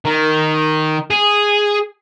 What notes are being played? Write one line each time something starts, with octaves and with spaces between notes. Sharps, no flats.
D#3
G#4